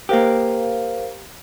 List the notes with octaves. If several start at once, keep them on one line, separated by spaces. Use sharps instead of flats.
A#3 G4 A#4 C5 F5